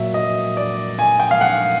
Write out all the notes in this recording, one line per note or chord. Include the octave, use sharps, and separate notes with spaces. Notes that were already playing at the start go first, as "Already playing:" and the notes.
Already playing: A#2 F#3 E5
D#5
D5
G#5
G5
F5
F#5